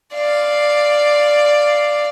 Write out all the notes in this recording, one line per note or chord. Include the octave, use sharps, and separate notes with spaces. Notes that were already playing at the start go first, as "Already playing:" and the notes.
D5 F5